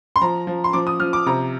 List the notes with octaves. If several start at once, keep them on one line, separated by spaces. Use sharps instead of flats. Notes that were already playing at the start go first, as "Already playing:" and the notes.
C6
F3 A#5
F3
C6
F3 D6
D#6
F3 F6
D6
C3 A#5